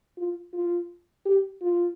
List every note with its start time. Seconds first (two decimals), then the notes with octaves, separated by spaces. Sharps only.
0.17 F4
0.53 F4
1.25 G4
1.62 F4